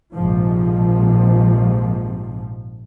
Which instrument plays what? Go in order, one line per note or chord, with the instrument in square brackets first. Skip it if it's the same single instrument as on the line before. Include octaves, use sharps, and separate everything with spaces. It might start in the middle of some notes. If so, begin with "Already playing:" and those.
[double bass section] A#1 G#2 C3 F3